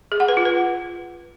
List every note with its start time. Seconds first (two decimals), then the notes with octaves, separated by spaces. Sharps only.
0.12 G#4
0.20 F#5
0.28 B4
0.37 F4
0.45 B4